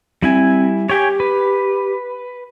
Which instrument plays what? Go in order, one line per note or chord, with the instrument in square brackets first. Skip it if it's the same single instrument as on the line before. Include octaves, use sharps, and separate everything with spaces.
[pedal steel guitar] G3 E4 G#5 [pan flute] C4
[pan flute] G4 [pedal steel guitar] C#5 G5 G#5
[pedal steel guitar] B4